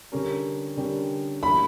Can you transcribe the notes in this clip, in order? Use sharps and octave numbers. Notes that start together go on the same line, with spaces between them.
D3 G3 C#4 G4 A#4
D3 G3 C#4 G4 A#4
E3 G3 A#3 B5